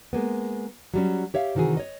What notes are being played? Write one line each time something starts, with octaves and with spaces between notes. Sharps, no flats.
G#3 A#3 B3
F#3 G3 C#4
G4 C#5 E5 F5
C3 D#3 E3 F#4 G#4
C#5 D#5